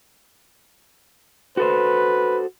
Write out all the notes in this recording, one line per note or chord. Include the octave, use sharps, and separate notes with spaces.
F#4 A4 B4 C5